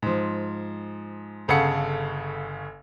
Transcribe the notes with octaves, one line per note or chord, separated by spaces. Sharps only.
G#2 F3
G1 C#3 A4 F5 F#5 C#7